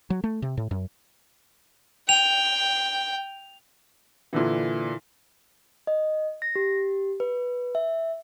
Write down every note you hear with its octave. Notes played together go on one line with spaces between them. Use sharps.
F#3
A3
C3
A2
F#2
G5 F7
A#2 D3 E3
D#5
A#6
G4
B4
E5